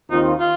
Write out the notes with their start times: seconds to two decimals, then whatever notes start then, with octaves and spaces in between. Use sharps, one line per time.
0.10 D#2 D#3 C4 D#4 F4
0.40 F4